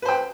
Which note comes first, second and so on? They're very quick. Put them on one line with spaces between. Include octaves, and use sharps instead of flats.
B4 C5 G5